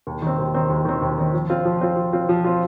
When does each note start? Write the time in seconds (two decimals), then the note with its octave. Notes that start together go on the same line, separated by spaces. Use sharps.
0.07 D#2
0.22 D#3 C4
0.38 D#2
0.54 D#3 C4
0.70 D#2
0.85 D#3 C4
1.02 D#2
1.18 D#3 C4
1.34 F3
1.50 C4 F4
1.65 F3
1.81 C4 F4
1.96 F3
2.13 C4 F4
2.29 F3
2.44 C4 F4